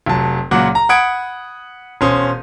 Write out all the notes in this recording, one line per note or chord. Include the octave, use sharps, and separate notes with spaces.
F1 F#3 A5
C#2 A#2 F#3 F#5 D6
A#5
F#5 B5 D#6 G#6 D7
E1 C#4 C5 D#6